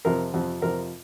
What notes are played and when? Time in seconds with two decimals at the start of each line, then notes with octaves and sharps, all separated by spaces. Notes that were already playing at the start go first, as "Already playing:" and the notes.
0.05 F2 C3 F3 A#4
0.33 F2 C3 F3
0.62 F2 C3 F3 A#4